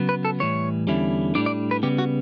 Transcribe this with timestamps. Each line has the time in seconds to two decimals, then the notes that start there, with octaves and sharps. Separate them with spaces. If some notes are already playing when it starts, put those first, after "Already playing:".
Already playing: C#3 F#3 B3
0.09 B4
0.25 A4
0.40 A2 E3 G3 C#5
0.87 E2 D3 G3 C#4 E4
1.35 A2 G3 D4 D5
1.46 D5
1.71 B4
1.83 C#3 G3 B3 G4
1.98 F#4